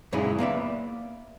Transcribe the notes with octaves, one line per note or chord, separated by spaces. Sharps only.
F#2 A#2 C#3 G#3 D#4 E4
A#3 B3 D5 E5